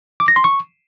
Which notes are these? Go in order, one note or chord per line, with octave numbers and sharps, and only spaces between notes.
D6
A#6
C6
C#6